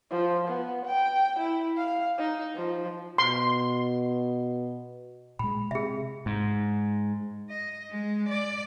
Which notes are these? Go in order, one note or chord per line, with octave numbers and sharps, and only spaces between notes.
F3
B3
G5
E4
F5
D#4
F3
B2 C6
A#2 G#3 B5
C3 G#4 E5
G#2
D#5
G#3
D5